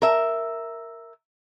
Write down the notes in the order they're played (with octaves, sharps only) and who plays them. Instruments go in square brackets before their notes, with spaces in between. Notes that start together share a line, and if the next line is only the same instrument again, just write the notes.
[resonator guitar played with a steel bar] A#4 E5